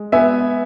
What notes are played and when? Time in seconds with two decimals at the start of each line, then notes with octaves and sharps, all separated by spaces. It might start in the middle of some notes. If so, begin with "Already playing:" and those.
Already playing: G#3
0.12 B3 E5 G#5